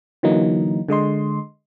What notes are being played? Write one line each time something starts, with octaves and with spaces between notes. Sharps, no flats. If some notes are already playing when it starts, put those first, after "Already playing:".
D3 E3 F#3 A#3 D#4
D3 G#3 D#5 C6